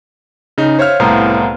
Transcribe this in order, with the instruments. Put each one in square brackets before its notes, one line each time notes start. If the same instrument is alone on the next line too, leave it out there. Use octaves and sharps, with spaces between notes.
[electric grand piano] C#3 D#4
C5 C#5 E5 F5 F6
C2 A2 B3 C5 F5 A#5